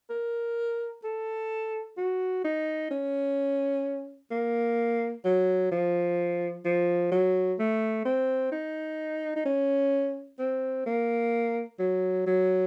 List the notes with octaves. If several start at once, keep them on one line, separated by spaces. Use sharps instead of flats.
A#4
A4
F#4
D#4
C#4
A#3
F#3
F3
F3
F#3
A3
C4
D#4
D#4
C#4
C4
A#3
F#3
F#3